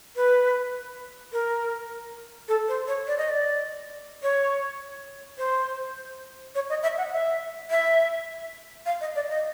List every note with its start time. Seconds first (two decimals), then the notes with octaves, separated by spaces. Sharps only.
0.16 B4
1.33 A#4
2.48 A4
2.68 C5
2.87 C#5
3.07 D5
3.18 D#5
3.29 D5
4.23 C#5
5.38 C5
6.55 C#5
6.70 D#5
6.83 E5
6.98 F#5
7.12 E5
7.70 E5
8.86 F5
9.01 D#5
9.15 D5
9.30 D#5